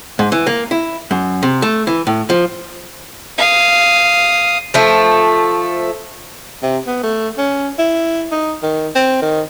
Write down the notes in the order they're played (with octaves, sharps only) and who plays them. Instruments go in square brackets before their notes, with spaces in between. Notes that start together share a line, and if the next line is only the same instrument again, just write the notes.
[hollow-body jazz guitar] G#2
E3
A#3
E4
F#2
C3
A3
E3
A2
F3
[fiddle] F5 D#6
[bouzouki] F3 A3
[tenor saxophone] C3
B3
A3
C#4
E4
D#4
D#3
C4
D#3